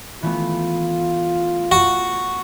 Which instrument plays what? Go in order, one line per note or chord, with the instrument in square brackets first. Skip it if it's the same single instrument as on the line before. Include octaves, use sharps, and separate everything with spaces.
[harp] E3 A3 B3 [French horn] F4
[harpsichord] F#4